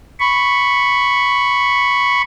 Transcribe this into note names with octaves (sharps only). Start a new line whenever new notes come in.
B5 C#6